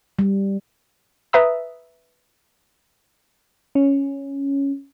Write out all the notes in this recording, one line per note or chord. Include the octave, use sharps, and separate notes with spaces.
G3
B4 E5 A#5 D#6
C#4